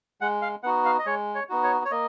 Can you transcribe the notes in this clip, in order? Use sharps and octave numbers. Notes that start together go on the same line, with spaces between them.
G#3 F#5
F5
B3 D#4 F#4 F#5
F5
D#5
G#3 C#5
C#5
B3 D#4 F#4
C#5
C#5
A#3 D#5